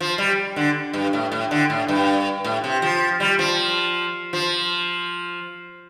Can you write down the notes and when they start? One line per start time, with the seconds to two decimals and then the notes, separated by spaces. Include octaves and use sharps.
0.01 F3
0.18 G3
0.56 D3
0.93 G2
1.13 A2
1.32 A2
1.51 D3
1.70 A2
1.88 G2
2.44 A2
2.64 C3
2.82 F3
3.20 G3
3.39 F3
4.33 F3